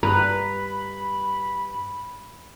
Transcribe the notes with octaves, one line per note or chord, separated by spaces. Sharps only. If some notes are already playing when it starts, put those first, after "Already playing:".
G2 B4 A#5 B5